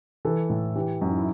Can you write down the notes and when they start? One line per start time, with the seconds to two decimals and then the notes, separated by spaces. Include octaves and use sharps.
0.25 E3 A4
0.49 A2
0.75 E3 G4
1.01 F#2
1.09 D#4
1.18 E4